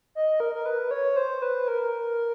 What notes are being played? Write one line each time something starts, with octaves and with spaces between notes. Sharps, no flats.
D#5
A#4
A#4
B4
C#5
C5
B4
A#4